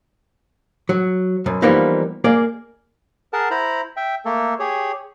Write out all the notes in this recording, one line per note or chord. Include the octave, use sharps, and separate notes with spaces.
F#3
B1 F#2
E3 F3 G3 A#3 B3 D#4
A#3 G#4 D5
G#4 A#4 F#5 A5
E4 C5 A#5 B5
E5 G5
A3 A#3 A4
G4 G#4 C#5